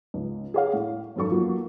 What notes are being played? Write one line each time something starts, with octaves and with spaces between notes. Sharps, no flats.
C#2
G#4 C#5 F5
A2
G#1 F#2 A4 C#6
F3 F#3 A#3 B3